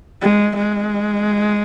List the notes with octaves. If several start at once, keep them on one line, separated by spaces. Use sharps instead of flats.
G#3
G#3